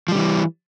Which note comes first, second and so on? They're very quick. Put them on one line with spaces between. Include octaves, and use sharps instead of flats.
F3 G3 D3 E3